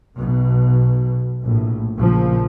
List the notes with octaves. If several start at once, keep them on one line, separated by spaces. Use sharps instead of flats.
B1 B2
A#1 A2
A#1 A#2 C#3 F3